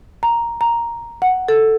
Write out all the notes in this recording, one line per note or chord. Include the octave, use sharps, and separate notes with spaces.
A#5
A#5
F#5
A4